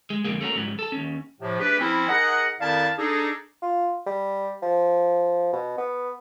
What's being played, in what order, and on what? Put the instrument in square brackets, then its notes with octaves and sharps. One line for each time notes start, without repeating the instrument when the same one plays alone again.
[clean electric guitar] G#3
F2 B2 D3 G#3 A#3
A3 A#3 C#4 D#4 F#4 A#4
G#2 C#3 E3 F#3 G3
A4 A5
D#2 C#4
[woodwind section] A2 C3 F3
A3 D4 G4 G#4 B4
F3 C4 C#4 E4
D#4 G#4 A#4 D#5 F#5
F2 D#3 E4 D5 F5 A5
D4 D#4 G#4 A4
[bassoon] F4
G3
F3
B2
B3